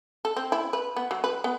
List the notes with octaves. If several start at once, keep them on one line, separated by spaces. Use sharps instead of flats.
A4
C4
E4
B4
B3
F#3
B4
B3